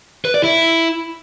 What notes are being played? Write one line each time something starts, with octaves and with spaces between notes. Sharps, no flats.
B4
D5
E4